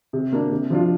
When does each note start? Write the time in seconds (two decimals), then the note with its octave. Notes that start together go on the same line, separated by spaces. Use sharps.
0.13 C3
0.32 A#3 D4
0.51 C3
0.70 F3 D4 F4